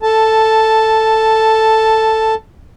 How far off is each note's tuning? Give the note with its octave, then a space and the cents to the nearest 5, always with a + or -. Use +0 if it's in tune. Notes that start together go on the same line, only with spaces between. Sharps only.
A4 +10 A5 +0